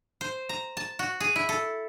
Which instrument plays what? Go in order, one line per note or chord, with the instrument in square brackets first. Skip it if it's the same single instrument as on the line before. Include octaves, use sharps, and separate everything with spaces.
[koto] C5
A#5
A5
F#4
G#4
E4
A4